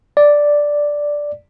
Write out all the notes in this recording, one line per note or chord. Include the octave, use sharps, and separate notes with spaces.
D5